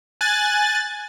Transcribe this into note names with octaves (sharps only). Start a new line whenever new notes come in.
G#5 F#6 A6